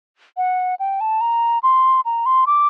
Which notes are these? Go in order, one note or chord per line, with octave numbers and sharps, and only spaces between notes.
F#5
G5
A5
A#5
C6
A#5
C6
D6